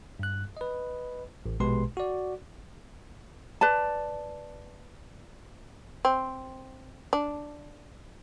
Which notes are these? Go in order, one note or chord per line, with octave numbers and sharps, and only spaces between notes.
G2 F#6
B4 D#5
A1
A#1 B2 G#3 G4 B4 C6
F#4 D5
B4 D5 A5
C4
D4